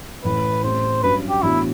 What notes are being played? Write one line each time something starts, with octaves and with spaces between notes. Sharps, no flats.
A1 A2 E3 B4
A1 A2 G3 C4 C5
A1 G2 F#3 B4
G4
A2 E3 B3 D4 E4 F#4